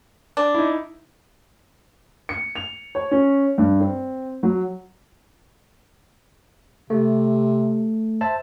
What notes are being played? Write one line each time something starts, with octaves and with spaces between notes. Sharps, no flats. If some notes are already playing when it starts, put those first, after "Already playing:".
D4
D#4 E4
C#7
F7
C#5
C#4
G2
C4
F#3
C3 A3
C5 E5 A5